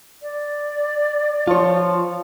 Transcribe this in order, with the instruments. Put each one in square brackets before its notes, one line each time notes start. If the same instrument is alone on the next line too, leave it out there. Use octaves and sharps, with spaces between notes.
[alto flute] D5
[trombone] F3 [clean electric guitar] F4 C#5